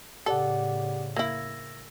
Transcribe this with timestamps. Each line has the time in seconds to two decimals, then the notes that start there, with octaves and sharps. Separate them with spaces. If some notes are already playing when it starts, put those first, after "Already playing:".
0.26 A2 C#3 G4 A4 D5 F#5
1.16 A#3 E4 E6 G#6 A#6